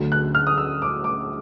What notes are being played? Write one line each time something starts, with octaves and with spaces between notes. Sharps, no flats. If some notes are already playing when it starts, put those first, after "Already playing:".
Already playing: D2 D3 F#3
F#6
F6
D#6
E6
D6
D6